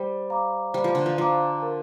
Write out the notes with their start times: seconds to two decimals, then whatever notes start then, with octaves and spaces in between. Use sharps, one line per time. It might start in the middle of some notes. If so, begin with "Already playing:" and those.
Already playing: G3 C5
0.30 F5 A#5 D6
0.73 G3 C5
0.84 F3
0.95 D3
1.06 F3
1.18 F3 F5 A#5 D6
1.62 A#4